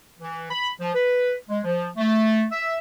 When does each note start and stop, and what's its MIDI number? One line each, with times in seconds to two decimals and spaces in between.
0.20 0.50 52
0.51 0.69 83
0.80 0.91 53
0.95 1.33 71
1.49 1.59 56
1.64 1.87 53
1.97 2.45 57
2.52 2.78 76